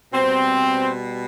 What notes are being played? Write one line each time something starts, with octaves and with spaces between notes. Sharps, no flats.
B2 G3 C4